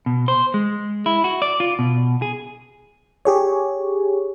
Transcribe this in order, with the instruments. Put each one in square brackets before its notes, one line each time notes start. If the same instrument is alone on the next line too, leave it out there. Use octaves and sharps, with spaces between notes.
[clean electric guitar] B2
C5
G#3
E4
F#4
D5
F4
B2
G#4
[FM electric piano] G4 G#4 C#5